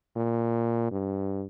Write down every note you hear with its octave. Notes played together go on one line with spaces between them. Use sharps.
A#2
G2